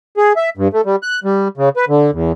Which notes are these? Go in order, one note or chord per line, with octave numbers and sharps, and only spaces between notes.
G#4
E5
G2
A3
G3
F#6
G3
C#3
B4
D3
E2